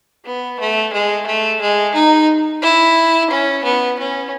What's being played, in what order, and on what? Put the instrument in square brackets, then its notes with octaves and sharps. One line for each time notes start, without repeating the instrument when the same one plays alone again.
[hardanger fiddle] B3
A3
G#3
A3
G#3
D#4
E4
C#4
B3
C#4